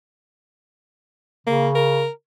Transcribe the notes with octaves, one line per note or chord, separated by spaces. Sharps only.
C#3 A#3
A#4